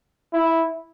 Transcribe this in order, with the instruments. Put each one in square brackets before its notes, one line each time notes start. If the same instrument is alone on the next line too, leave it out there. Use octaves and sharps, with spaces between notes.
[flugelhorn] E4